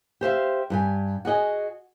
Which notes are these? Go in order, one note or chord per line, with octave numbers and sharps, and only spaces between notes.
G4 C5 E5 F5
G2 G3 G#5
F#4 G#4 D#5 G#5